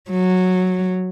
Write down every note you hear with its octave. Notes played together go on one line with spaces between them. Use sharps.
F#3